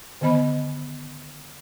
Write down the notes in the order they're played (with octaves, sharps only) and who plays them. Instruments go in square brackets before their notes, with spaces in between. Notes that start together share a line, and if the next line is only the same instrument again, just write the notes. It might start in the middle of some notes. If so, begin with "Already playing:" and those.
[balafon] D3 D#3 B3 D#5 B5